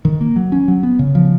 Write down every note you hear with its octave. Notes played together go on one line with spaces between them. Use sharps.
D#3
A#3
F#3
C#4
F#3
B3
C#3
F3